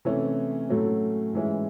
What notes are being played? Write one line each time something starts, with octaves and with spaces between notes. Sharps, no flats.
C3 E3 A3 C#4 E4
A2 F#3 A3 C#4
G#2 E3 G#3 C#4 E4